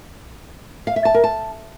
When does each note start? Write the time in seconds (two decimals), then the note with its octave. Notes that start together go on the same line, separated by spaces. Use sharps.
0.87 F5
0.96 E5
1.05 A5
1.14 A#4
1.24 A5